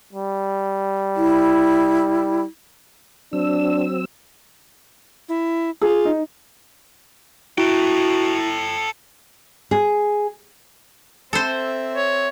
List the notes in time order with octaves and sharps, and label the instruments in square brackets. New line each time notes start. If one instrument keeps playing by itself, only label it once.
[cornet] G3
[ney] E4
[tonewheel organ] F#3 C4 E6 [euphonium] D4
[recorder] E4
[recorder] F4 [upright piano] G#4
[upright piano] D#4
[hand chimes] E4 [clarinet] F#4 [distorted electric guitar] A4 G5
[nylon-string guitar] G#4
[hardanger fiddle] C4 E5 [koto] A4 C5
[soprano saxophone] C#5